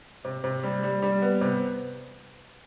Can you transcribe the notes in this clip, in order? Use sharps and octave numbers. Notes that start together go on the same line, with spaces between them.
C3
C3
G3
G3
G3
B3
C3